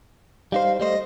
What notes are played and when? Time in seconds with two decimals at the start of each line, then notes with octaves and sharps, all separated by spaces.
0.52 G3 D#4 C5 F5
0.80 G3 A3 C5 D#5